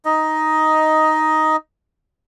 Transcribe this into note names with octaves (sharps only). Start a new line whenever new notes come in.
D#4 D#5